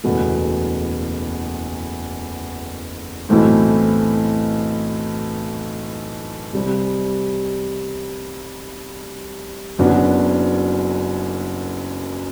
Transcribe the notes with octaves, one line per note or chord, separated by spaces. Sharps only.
F#1 E2 B2 A3
B1 A2 E3 A3 C4
C2 C3 G3 C4
F#1 F#2 F#3 B3 D4